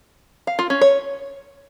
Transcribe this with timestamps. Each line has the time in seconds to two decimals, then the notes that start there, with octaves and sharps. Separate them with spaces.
0.47 F5
0.59 F4
0.70 C#4
0.81 C#5